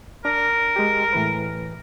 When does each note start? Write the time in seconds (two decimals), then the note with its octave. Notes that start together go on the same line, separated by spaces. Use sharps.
0.25 D4 A#4
0.76 G#3 G4
1.13 A2 E3 B4